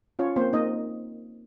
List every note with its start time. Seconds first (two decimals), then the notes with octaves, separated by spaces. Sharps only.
0.19 C#4 F4 C#5
0.36 A#3 C4 C5
0.53 A#3 D#4 D#5